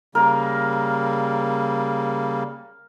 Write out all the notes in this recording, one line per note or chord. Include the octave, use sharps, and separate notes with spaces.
C#3 G3 A#3 A#4